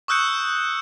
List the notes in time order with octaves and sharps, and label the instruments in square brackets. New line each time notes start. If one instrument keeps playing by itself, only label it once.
[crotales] C#6 D#6 E6 F#6 G6 C#7